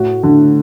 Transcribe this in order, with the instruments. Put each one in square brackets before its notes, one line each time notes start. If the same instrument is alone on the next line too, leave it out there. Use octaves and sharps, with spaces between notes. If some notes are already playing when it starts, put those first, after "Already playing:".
Already playing: [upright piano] A2 F#4
D3